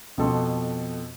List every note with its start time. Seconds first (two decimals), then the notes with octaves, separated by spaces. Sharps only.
0.18 F2 B2 A4 C6